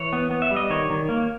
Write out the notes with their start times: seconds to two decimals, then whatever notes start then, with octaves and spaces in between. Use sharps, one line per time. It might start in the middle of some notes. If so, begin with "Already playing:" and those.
Already playing: E3 C#5
0.13 B3
0.31 B3
0.42 E5
0.51 G3
0.56 D#5
0.70 D#3 C#5
0.90 D#3
1.09 A#3